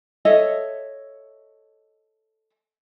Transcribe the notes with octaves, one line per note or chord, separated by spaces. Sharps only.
A4 C#5 D#5 E5